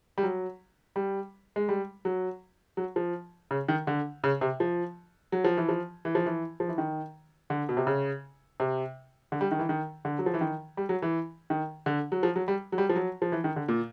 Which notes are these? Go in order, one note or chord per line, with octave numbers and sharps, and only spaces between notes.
G3
F#3
G3
G#3
G3
F#3
F#3
F3
C#3
D#3
D3
C#3
C3
F3
F#3
F3
E3
F3
E3
F3
E3
F3
E3
D#3
D3
B2
C3
C#3
C3
D3
G3
D#3
E3
D#3
D3
F#3
F3
E3
D#3
G3
F#3
E3
D#3
D3
F#3
F3
F#3
G3
F#3
G3
F3
F#3
F3
E3
D#3
D3
A#2